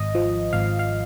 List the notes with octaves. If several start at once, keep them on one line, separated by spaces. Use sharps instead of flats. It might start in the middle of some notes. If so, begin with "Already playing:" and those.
Already playing: G#1 D#5
F3
G#1 F5
F5